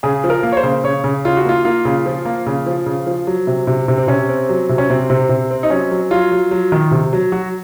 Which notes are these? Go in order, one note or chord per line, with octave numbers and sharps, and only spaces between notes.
C#3 G#4
F3
A#4
A#3
C#5
C5
C#3
C#3 C#5
C#3
C#3 F4
F#4
A#3 F4
A#3 F4
C#3
F3
A#3
C#3
F3
C#3
F3
F#3
C3
C3
C3
C4
C3 C#4
C4
F#3
C3
C#4
C3 C4
C3
C3
C4
D#4
F#3 C#4
F#3
F#3 F4
F#3
F#3
D#3
C3
F#3
F#3 F#4